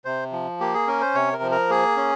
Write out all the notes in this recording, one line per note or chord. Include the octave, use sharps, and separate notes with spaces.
C3 C5
F3
A#3 G4
G#4
C#4 A#4
C5
C3 C#5
A#4
F3
A#4
A#3 G#4
C#4